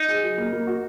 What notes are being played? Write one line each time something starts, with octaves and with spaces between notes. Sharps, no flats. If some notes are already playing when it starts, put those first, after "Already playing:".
Already playing: D#4
G#4
F#3
A#3
A#3
F#4